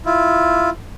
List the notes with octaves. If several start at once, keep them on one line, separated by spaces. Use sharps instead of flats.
E4 F4